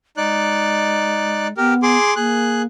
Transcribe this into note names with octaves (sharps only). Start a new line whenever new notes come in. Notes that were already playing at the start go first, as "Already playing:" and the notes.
G#3 D#4 D5 F#6
B3 G4 A#4
G#4 C6 D6
A#3 G#4 F#6